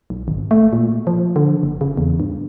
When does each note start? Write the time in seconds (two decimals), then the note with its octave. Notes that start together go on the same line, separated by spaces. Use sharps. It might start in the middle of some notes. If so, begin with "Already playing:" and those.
0.10 B1
0.28 G#1
0.51 A3
0.73 A#2
1.07 F3
1.36 D3
1.63 F#1
1.81 C#3
1.97 E2
2.20 G2